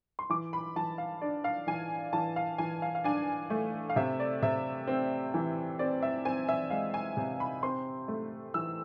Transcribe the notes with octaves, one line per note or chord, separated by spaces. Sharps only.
C6
E3 D6
B5
E3 A5
F5
D4 D5
F5
E3 G#5
E3 A5
F5
E3 G#5
F5
F5
D4 G#5
A3
F5
C3 E5
D5
C3 E5
C4
E3
C4 D5
E5
C4 G#5
E5
G#3 F5
G#5
C3
B5
C4 C6
A3
E3 E6